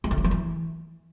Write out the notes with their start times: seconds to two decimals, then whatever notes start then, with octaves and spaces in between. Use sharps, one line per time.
0.04 G#3
0.11 D3
0.18 F#3
0.24 F3
0.31 E3